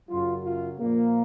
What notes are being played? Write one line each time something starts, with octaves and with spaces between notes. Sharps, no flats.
F#2 C#3 F#3 F4
F4
A#2 F3 A#3